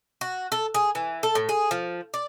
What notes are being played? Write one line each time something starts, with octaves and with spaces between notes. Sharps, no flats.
F#4
A4
G#4
E3
A4
A2
G#4
F3
D5